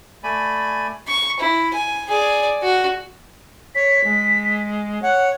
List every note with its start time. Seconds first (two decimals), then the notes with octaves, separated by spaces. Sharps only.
0.24 A3 D5 G#5 B5
1.07 C#6
1.40 E4
1.75 G#5
2.08 G#4 D5
2.63 F#4
3.75 C#5 B6
4.04 G#3
5.02 C#5 F#5